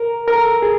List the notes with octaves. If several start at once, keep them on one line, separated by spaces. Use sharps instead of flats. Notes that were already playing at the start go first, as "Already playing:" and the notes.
Already playing: A#4
A#4
A4
G#4